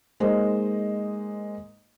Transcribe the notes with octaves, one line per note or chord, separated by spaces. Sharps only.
G#3 A#3 D#4 C5 D#5